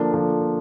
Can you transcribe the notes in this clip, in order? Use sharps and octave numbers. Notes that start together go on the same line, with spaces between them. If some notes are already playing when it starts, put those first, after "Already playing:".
Already playing: D3 F3 A#3 D4
D3 F3 A#3 D4